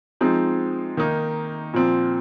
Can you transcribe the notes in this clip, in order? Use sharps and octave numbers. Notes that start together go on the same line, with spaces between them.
F3 G#3 C4 D#4
D#3 A#3 D#4
A#2 F3 C4